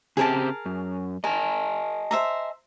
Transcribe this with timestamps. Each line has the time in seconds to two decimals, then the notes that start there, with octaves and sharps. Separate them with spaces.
0.17 C#3 C4 G4 G#4 A#4 A5
0.66 F#2
1.24 A#4 D#5 G#5 A5
2.11 C5 E5 A#5